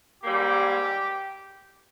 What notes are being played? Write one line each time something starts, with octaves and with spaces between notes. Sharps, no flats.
G#2 G3 A#3 G4